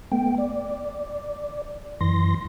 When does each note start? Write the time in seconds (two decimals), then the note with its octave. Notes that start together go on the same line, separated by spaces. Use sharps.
0.12 A3 B3 G5
0.38 D5
2.01 F#2 E3 C6 A#6